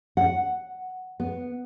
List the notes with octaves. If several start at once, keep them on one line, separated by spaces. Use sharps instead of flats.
F#5
B3